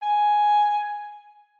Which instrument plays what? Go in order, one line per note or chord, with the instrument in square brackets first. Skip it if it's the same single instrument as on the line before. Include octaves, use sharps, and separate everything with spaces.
[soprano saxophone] G#5